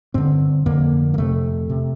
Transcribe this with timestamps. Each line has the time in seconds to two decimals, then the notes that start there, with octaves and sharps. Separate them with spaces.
0.14 G2 D3 C4
0.66 F2 D3 A#3
1.14 A#3
1.18 F2 C3 A3
1.69 C3